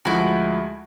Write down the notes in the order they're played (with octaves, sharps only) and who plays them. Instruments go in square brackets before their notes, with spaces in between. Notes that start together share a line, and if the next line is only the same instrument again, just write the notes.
[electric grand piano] D2 F3 G#3 [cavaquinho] E4 F#4